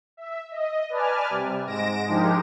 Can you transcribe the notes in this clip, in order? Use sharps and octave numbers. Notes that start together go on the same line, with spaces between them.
E5
D#5
B4 D5 G#5 A5 F6
C3 G3
G#2 G#3 A#6 D7 E7
F3 G#3 D4 D#4 G4 A#4